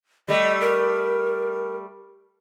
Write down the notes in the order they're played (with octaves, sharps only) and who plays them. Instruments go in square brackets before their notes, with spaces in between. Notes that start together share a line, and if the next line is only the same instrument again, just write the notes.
[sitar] G3 A3 [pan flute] D#5
[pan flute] A#4